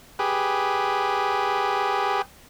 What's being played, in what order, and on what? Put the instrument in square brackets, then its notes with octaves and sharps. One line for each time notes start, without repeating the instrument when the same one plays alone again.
[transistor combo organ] G4 G#4 B4